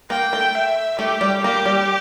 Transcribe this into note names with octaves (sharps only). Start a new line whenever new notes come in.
A#3 G5
A3
E5
A3 G4
G3
A#3 G4
G3